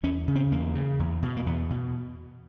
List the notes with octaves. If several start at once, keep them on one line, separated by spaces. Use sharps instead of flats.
E2 C#4
C#3
C4
E2 A#3
C#3
E2
B2
A#3
E2 B3
B2